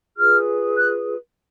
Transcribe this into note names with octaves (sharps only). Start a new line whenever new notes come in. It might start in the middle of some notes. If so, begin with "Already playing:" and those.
F4 G#4 B4 F6
F#6